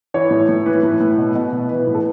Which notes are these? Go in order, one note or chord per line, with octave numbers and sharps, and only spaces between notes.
E3 C#5
A2
A2
E3 B4
A2
A2
B2
B2
B2
E3 B4
A2
A4